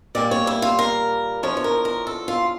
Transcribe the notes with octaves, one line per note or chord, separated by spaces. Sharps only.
A#2 G3 A#3 D5
C#5
E4
F4
A#4
E2 D3 F3 C#4 C#5
C#5
A#4
A#4
A4
F4